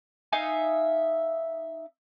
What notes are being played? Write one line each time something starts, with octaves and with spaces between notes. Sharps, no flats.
D#4 E5 F5 G#5